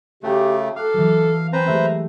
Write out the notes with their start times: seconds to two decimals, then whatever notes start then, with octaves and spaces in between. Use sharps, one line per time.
0.23 C#3 A3 F#4 G4 G5 A#5
0.76 A4 F5 D6 F#6
0.94 E3 F#3
1.53 C4 B4 C5 G#5 A#5 G6
1.67 G#3 A3 G4 E5